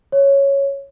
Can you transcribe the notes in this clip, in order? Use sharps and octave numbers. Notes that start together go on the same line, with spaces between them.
C#5